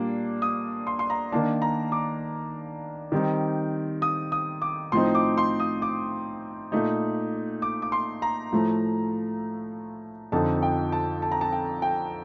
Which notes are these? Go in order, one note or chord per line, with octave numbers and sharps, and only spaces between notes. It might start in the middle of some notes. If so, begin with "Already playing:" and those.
Already playing: A#2 G3 A#3 D4
D#6
C6
C6
A#5
D#3 A#3 D4 A5
A#5
D6
D#3 G3 C4 D#4
D#6
D#6
D6
A2 F3 C4 D#4 C6
D6
C6
D#6
D6
A#2 A3 D#4
D6
D6
C6
A#5
A2 F3 A3
F2 D3 F3 C4 D#4 A5
G5
A5
A5
A#5
A5
G5
G5